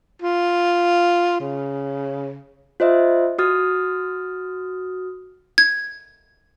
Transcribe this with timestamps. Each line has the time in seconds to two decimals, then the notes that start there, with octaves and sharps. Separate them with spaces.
0.22 F4
1.40 C#3
2.80 F4 C5 D#5 E5
3.39 F#4 D#6 F6 A6
5.58 G#6